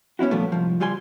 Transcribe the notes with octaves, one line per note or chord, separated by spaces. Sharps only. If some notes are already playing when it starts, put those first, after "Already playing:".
B3 C#4 D4 E4 F#4
A#2 D#3 F3 G3 A3 B3
C2 G#2 F3
C#2 F3 G3 G4 G#5 C6